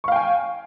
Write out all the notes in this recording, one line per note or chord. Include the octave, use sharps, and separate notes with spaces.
F5 G5 G#5 C#6